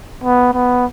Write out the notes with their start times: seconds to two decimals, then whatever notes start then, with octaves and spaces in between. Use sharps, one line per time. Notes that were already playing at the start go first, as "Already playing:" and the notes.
0.24 B3
0.54 B3